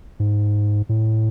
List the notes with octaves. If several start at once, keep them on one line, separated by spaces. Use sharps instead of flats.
G#2
A2